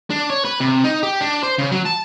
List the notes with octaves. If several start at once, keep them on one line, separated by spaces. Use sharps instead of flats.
D4
C#5
B4
C3
D#4
G4
D4
C5
C#3
F#3
A5